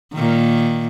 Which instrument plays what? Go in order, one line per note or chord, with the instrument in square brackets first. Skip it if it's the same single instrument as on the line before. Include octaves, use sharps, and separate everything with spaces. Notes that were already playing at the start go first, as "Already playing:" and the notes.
[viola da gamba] A#2 D#3